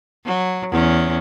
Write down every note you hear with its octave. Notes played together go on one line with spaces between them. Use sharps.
F#3
E2 C#4